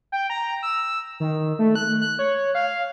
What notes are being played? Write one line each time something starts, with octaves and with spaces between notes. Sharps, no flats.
G5
A#5
E6
D#3
A3
F#6
F#6
C#5
F5